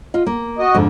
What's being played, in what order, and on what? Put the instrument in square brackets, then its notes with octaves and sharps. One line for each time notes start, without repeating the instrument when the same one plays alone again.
[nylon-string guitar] F4 D#5
A#3
[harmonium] F#4 D#5
[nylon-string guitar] F2 G#2 D3